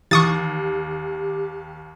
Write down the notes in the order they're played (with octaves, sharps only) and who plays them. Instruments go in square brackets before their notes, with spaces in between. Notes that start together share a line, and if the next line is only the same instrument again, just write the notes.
[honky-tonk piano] D#2 [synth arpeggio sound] E3 [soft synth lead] G4 [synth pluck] C#6 D#6 A6